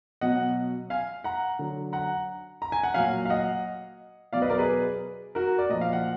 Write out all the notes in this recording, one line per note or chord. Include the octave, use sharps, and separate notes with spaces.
B2 F#3 D#5 F#5
F5 G#5
F#5 A#5
D3 F#3
F#5 A#5
A#5
G#5
F#5
A#2 F#3 F5 G#5
F5
D#5 F#5
B2 F#3 D5 F5
B4 D#5
A#4 D5
G#4 B4
F#4 A#4
D5
A#2 F3 D#5
F5
F#5